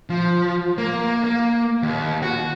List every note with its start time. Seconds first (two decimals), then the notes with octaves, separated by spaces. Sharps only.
0.10 F3
0.78 A#3
1.24 A#3
1.83 D#2
2.22 F#4